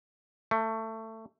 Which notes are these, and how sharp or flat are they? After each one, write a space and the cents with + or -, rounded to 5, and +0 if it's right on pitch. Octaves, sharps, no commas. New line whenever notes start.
A3 +20